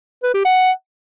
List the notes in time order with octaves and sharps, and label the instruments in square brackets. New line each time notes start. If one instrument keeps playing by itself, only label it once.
[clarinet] B4
G4
F#5